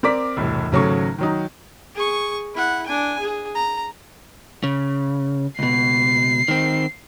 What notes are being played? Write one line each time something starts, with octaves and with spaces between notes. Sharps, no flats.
C4 A#4 D5 D6 B6
E1 C2 A2
G#1 C#3 F#3 A3 C#6
D#3 F#3 D#4
G#4 C#6
E4 F#5
D4 G#5
G#4
A#5
C#3
C#2 B2 C7
D#3 C4